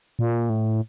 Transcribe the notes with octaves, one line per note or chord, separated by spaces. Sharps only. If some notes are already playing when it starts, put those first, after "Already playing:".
A#2
A2